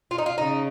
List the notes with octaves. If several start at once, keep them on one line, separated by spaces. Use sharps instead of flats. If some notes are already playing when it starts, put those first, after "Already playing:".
F4
D#4
F4
C#3 D#4